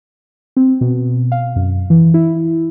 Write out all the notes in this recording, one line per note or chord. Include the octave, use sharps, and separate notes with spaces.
C4
B2
F5
F#2
E3
E4